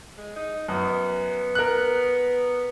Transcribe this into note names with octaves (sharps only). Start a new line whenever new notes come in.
G#3
D#4
F#2 B3
A#4 F#6